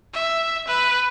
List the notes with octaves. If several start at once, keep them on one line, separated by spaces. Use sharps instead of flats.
E5
B4